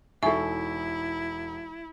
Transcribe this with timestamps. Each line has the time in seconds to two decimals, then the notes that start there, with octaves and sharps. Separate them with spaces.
0.23 E1 D#4 E4 A4 E5 G#5 C#6